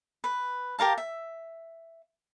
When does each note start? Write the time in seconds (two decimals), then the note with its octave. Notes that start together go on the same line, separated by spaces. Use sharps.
0.24 B4
0.79 G4 A#4 F5 A5
0.98 E5